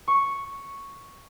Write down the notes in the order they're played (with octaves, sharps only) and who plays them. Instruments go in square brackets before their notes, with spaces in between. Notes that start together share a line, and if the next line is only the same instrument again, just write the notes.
[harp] C#6